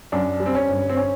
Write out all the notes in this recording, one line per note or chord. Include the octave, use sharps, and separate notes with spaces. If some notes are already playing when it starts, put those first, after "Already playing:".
F#2 D4
G3
C4
C#4
G1
C4
C#4